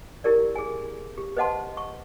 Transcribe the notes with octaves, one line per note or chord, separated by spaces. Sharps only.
E4 G4 A#4 D5
G#4 G#5
G4
B4 C5 D#5 F#5 A5 C6
C#6